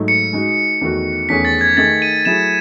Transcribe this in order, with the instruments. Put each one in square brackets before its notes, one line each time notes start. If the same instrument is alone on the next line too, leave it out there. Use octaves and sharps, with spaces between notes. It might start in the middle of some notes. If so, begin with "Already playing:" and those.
Already playing: [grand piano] G#2 F#3 A3 D#4
[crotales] C#7
[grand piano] G#3 D#4 F#4
E2 D#3 A3 D#4 F#4
[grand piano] E2 D#3 A3 C#4 G#4 [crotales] B6
[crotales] A6
G#6
[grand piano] D#3 A3 D#4 G#4 [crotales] A6
[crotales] D#7
[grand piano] F#3 A3 E4 G#4 [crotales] E7